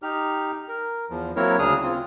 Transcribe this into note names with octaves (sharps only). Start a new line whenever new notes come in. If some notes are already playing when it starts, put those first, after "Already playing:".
D#4 G4 F6
A#4
E2 F3
F#3 A#3 C4 E4 A#4 C#5
D2 C#3 D4 G#4 D#6 F6
C4 F4